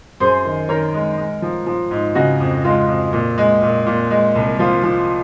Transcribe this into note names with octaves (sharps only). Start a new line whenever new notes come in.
F#2 G#4 C5
D#3
D#3 A#4 C#5
G#3
G#3
F3
F3
G#2
C#3 D#4 F#4
F2
G#3 F4
F2
A#2
G#3
A#2
A#2
G#3
C2
F3 F4
F3